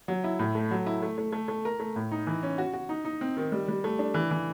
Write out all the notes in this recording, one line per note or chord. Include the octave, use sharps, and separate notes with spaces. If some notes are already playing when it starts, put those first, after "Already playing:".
F#3
E4
A2
A3
F#3
E4
A3
A3
A3
A3
A#4
A3
A2
D#4
E3
C#4
F#4
F#4
D#4
D#4
C4
D#3
G3
G3
A3
D4
E3
E3